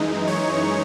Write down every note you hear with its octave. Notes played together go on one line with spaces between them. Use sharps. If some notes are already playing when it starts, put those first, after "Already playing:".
Already playing: F#2 E3 G#3 D#4
C#5